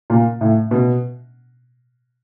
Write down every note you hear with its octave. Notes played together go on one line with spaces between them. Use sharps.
A#2
A2
B2